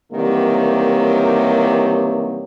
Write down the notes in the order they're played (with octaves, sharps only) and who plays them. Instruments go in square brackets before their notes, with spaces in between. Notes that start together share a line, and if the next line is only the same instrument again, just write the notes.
[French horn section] C3 D#3 E3 F#3 G3 A#3